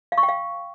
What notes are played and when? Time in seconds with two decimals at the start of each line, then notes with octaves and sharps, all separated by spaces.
0.12 F5
0.18 C#6
0.23 G5
0.29 F5